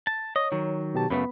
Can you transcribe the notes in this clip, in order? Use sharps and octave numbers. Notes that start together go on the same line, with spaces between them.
A5
C#5 D#5
D#3 F#3
B2 G4 A5
F#2 C#3 A3 B3 B5